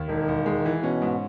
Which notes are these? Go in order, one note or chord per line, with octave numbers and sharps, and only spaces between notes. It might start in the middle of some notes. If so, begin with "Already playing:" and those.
Already playing: D#2
E1 D#3
E1
G#3
E3
B2 C#4
G#2